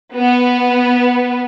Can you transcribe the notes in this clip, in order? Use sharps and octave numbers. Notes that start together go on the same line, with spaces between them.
B3